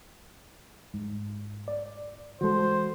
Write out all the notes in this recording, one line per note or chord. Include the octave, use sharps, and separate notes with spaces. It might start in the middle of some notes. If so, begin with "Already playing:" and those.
G#2
D5
E3 G#3 F#4 A4 C5